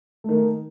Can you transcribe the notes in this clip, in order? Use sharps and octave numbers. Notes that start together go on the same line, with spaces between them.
D#3 A3 D#4